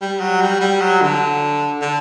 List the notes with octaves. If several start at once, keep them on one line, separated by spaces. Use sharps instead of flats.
G3
F#3
G3
G3
F#3
D3
D3